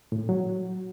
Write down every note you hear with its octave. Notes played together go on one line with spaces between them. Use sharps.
A2
A#2
F#3